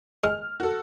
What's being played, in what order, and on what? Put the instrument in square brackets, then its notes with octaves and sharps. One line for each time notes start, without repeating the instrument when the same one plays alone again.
[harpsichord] G#3 [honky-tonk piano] F6
[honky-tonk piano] F#4 A4